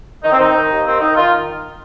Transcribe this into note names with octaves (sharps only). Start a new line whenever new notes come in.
D#3 D#4
C4
D#3 D#4
D#3
D#2
D#3 C4
D#3 D#4
D#3 F4